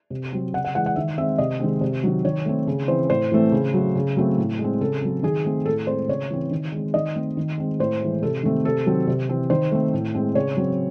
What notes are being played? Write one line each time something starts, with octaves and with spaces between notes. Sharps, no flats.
C3
F#3 C4
C#3 F#5
F#5
E3 G#3 F#5
F#5
D#3 E5
G#3 C4 E5
C3 D#5
D#3 G#3 C4
C3
D#3 F#3
D#3 C#5
A3 C4
C#3
E3 C4 C5
A2 C5
E3 A3 C4
C#3
F#3 A3
C#3
F#3 A3 C4
A2
G#3
C4
C#3 A4
F#3 C4
D#3 G#4
A3 C4
A2 A4
G#3 C4 C5
C#3 C#5
E3 C4
D#3
G#3 C4
D#3 D#5
A3 C4
D#3
G#3 C4
A2 C5
E3 G#3
C3 A4
D#3 A3 C4
C3 A4
D#3 F#3 C4
C3
E3 C4
D#3 C5
A3 C4
A2
G#3 C4
C#3 C#5
F#3 C4